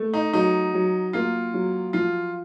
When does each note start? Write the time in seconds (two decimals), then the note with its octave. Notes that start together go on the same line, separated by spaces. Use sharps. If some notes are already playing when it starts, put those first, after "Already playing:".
Already playing: A3
0.14 D#4
0.33 F#3 D#4
0.74 F#3
1.13 A#3 F4
1.54 F#3
1.93 F3 F4